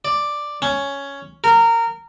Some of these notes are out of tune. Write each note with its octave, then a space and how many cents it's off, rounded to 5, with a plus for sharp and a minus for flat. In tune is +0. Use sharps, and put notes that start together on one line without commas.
D5 +5
C#4 +5
A#4 -20